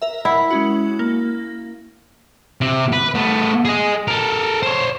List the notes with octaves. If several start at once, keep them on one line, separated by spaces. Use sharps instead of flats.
A#4 E5
E4 F#5
G#3 C#4 F#4
A#3
C3
B4
A3 B3
G#4 D#5
A4 A#4
C5 C#5